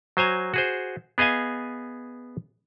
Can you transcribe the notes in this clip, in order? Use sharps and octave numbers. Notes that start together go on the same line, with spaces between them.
F#3 C5 G#5 A#5
F#4 G#4 C5
B3 G#4 D#5 F5 G#5